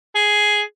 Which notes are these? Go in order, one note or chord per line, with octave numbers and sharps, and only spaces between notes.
G#4